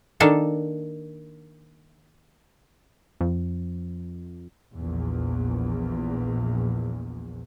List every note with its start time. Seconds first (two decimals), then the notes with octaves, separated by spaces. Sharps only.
0.20 D#3 A#3 D4 A4
3.21 F2
4.75 A#1 E2